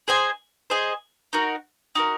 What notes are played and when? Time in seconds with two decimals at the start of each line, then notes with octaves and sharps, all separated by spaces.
0.08 G#4 C5 D#5 G#5
0.70 G#4 C5 D#5 G#5
1.33 D#4 F#4 A#4
1.95 D#4 F#4 A#4